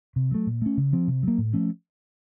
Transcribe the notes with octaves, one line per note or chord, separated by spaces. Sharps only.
C3
F#3 A3
A#2
A3 C#4
C#3
F3 C4
C3
F#3 A#3
A2
F3 A3 C#4